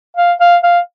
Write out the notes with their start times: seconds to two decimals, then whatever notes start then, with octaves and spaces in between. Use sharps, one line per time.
0.17 F5
0.41 F5
0.63 F5